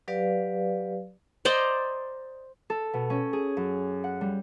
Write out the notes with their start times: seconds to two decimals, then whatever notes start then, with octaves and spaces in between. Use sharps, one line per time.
0.08 F#3 G4 B4 D5 F5
1.45 C5 D5 D#5 A#5
2.70 A4
2.94 B2
3.10 C#4
3.33 G#4
3.57 F#2
4.04 F#5
4.21 G3